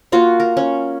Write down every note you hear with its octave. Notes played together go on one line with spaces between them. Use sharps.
A#3 F4 F#4 F5
A#4
C#4